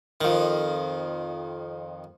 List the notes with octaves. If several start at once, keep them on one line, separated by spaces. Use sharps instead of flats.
F2 D#3